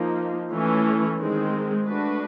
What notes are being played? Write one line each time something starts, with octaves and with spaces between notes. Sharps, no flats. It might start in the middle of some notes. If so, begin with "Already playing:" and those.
Already playing: F3 A#3 D#4
E3 A3 C#4
D#3 G#3 C4
A3 D4 F#4 B4